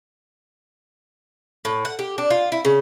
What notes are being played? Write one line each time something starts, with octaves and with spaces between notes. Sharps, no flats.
A2
F#5
G4
D4
F4
E4
C#3